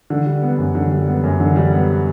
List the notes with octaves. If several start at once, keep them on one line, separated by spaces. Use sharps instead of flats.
D3
G3
B3
F#2
D3
G3
B3
F#2
D3
G3
B3